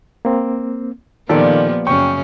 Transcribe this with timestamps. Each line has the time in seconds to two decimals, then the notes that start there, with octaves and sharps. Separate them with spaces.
0.25 A#3 C4
1.29 A#2 D#3 F3 A#3 B3 G4 A4 D5
1.87 F#2 C#3 C#4 G5 C#6